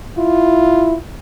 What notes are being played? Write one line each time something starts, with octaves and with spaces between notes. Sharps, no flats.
E4 F4